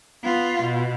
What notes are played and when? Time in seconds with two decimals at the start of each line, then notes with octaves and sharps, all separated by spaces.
0.23 B3 F4
0.63 B2